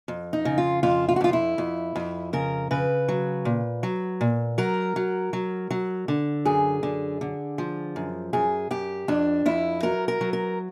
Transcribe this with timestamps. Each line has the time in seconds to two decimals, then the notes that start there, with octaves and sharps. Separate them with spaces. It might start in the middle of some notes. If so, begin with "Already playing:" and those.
0.08 F2
0.33 D#4
0.45 C#3
0.58 F4
0.83 F2 F4
1.08 F4
1.16 F#4
1.21 F2 F4
1.33 E4
1.58 F2
1.96 F2
2.33 C#3 A#4
2.71 C#3 B4
3.08 F#3
3.45 A#2
3.83 F#3
4.21 A#2
4.58 F#3 A#4
4.96 F#3
5.33 F#3
5.71 F#3
6.08 D3
6.45 F#2 G#4
6.83 D3
7.21 D3
7.58 F3
7.96 F#2
8.33 F#2 G#4
8.71 F#2 G4
9.08 F2 D4
9.46 F2 E4
9.83 F#3 A#4
10.08 A#4
10.21 F#3
10.33 A#4